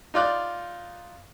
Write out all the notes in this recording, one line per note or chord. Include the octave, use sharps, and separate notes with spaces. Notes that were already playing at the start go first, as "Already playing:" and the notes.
D#4 F4 D5 F#6